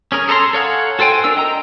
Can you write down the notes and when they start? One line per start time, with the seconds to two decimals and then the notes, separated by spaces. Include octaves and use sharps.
0.12 C#4 G#4 A#4
0.28 G#4 A4 B4 A#5 C6
0.53 A4 C#5 F5 F#5 G#5
0.99 F#4 A4 C5 G5 G#5
1.24 D4 A#4 E6
1.37 D#5 G5 A#5